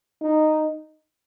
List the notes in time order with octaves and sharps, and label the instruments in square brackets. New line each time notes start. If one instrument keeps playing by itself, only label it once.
[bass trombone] D#4